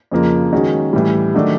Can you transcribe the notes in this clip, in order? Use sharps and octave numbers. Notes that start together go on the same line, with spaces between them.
F2 C#3 F3 A#3
D#3 G#3 C#4 F#4
A2 E3 G3
D#3 F#3 A3 D4 F#4